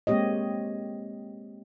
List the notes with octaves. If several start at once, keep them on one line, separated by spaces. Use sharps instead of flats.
G#3 A#3 C4 G4 C#5 D#5